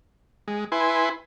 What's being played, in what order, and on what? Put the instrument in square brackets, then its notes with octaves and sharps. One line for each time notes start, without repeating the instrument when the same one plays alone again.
[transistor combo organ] G#3
E4 B4 G#5 C6